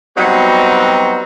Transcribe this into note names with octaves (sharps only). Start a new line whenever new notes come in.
F#3 G3 B3 C4 D#4 F#4